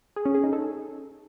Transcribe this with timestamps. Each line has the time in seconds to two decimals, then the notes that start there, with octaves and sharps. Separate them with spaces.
0.16 G#4
0.26 C#4
0.35 G#4
0.44 D#4
0.53 A4